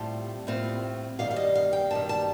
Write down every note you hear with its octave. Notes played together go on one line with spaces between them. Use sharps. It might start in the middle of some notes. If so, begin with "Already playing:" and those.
Already playing: A2 G3 C4 F4 A5
A2 G3 C4 F4
G2 D#3 G3 F5
F5
D#5
F5
G5
G2 D#3 G3 A5
A5